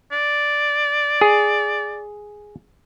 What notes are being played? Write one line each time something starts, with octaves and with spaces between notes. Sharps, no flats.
D5
G#4